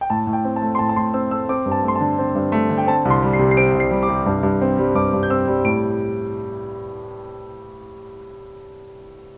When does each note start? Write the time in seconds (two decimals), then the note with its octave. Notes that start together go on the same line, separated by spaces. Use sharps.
0.01 G5
0.10 A2 A5
0.27 A2
0.33 G5
0.45 C4
0.56 A5
0.62 A3
0.75 C6
0.79 A2 A5
0.89 A5
0.96 A2 C6
1.14 C4 E6
1.31 A3 E6
1.49 C4 D6
1.66 G2
1.72 A5
1.83 A3
1.88 C6
1.95 D3 A5
2.19 C4
2.35 G2
2.52 A3
2.70 D3
2.78 G5
2.87 C4 A5
3.05 C2
3.10 C6
3.22 G3
3.33 C7
3.39 C3
3.51 C7
3.57 C4 D7
3.74 C2
3.80 C7
3.91 G3
4.03 D6
4.09 C3
4.26 G2
4.43 G2
4.61 C4
4.78 G3
4.95 G2 D6
5.13 G2
5.23 G6
5.30 C4 E6
5.47 G3
5.65 A2 D7